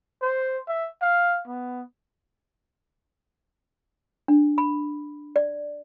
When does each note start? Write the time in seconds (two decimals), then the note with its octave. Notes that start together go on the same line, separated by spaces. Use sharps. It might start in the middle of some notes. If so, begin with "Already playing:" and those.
0.22 C5
0.68 E5
1.02 F5
1.48 B3
4.28 D4
4.58 B5
5.36 D5